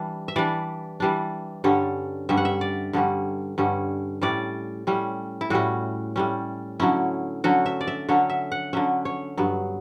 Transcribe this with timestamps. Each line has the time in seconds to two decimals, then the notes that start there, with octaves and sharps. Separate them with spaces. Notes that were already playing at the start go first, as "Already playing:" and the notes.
Already playing: E3 G3 D4
0.28 E5
0.36 E3 G3 D4 D5
1.00 E3 G3 D4
1.64 G2 D3 G3 C#4 C#5
2.29 G2 D3 G3 C#4 E5
2.37 F#5
2.45 E5
2.61 D5
2.93 G2 D3 G3 C#4
3.58 G2 D3 G3 C#4
4.22 A2 G3 C#4 D5
4.87 A2 G3 C#4
5.41 E4
5.50 A2 G3 C#4 F#4
6.16 A2 G3 C#4
6.80 D3 F#3 C#4 E4
7.44 D3 F#3 C#4 F#4
7.66 E5
7.81 D5
7.87 E5
8.09 D3 F#3 C#4 C#5
8.30 E5
8.52 F#5
8.73 D3 F#3 C#4 E5
9.05 C#5
9.37 G2 F#3 B3